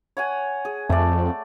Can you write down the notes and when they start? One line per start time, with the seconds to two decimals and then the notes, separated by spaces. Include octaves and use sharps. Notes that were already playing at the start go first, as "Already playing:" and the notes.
0.17 C#5 F#5 G#5
0.65 G#4
0.89 F2 A3 D5